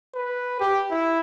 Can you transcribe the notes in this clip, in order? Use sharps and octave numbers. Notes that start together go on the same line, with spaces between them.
B4
G4
E4